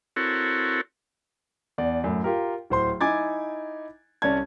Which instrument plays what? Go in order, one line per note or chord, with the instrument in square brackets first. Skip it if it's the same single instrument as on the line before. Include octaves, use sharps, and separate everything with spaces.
[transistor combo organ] C4 E4 F#4 A4 A#4 C#5
[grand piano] E2 D5
F#2 A2
F4 G4 A#4
D1 C5 C6
D#4 E4 G#5 D6 G#6 A6
C2 C#4 C#5 D5 A5 G#6